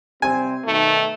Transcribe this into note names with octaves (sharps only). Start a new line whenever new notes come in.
C3 G3 C4 G#5
B2 D#3 A3